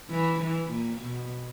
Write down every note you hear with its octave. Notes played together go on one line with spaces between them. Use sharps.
E3
E3
A#2
B2